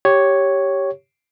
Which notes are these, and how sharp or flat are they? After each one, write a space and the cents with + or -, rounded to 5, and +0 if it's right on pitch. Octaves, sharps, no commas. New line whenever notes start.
G4 -5 C#5 +0